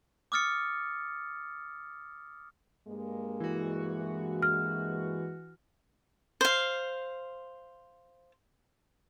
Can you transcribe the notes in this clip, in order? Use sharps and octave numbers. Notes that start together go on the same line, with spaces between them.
D6 D#6 F6 A6 C#7
G2 G#3 A#3
E3 F#4
F6
C5 F5